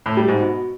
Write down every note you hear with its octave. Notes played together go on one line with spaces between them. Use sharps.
A2
G3
G#2
B2